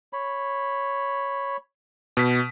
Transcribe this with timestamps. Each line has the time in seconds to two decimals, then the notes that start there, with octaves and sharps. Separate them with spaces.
0.13 C#5 B5
2.17 B2 B6